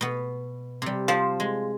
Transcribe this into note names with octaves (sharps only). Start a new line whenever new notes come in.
B2 B3
C3 G3
F3 C5 A5
G#3